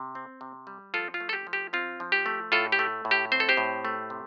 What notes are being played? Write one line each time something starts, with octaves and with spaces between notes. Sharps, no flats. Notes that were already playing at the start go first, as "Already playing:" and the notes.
Already playing: C3
C4
C3
G3
F3 F4 A4
F4
A3
A4
G4
F3
G4
C4 F4
F3
G4
A3
A2 F4 A4
G4
A3
A2
G4
C4 C5
A4
G4 C5
A2
A3
C3